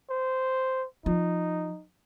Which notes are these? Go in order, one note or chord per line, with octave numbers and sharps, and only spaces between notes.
C5
F3 D#4